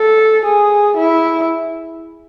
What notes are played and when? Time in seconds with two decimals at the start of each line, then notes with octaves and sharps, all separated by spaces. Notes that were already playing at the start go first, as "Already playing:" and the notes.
Already playing: A4
0.45 G#4
0.97 E4